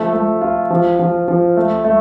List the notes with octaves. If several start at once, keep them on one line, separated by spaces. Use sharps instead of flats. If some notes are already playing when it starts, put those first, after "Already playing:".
Already playing: F3 A3
A3
F4
F3
F3
F3
A3
A3